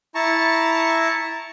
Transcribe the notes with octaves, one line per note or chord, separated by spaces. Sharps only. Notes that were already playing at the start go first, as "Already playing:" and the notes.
E4 A5 A#5 C#6